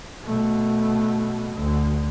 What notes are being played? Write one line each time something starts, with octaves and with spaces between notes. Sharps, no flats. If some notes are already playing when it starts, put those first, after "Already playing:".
B2 A3
D2